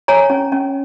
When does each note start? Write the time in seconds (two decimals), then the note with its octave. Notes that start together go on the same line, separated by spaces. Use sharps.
0.08 C#5 G#5 A#5
0.30 C#4
0.52 C#4